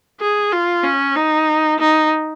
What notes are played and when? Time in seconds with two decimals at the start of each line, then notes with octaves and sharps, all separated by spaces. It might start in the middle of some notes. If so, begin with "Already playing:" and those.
0.21 G#4
0.52 F4
0.84 C#4
1.16 D#4
1.80 D#4